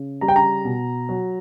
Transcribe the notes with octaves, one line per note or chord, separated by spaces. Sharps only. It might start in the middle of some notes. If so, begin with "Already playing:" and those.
Already playing: C#3
G3 A#5
G5
A#5
B2
F#3